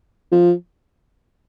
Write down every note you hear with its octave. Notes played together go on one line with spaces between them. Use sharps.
F3